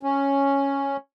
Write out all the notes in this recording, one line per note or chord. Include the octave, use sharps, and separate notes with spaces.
C#4